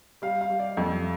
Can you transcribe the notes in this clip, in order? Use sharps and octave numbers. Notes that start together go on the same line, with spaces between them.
G3 F5
F5
G3
D5
F2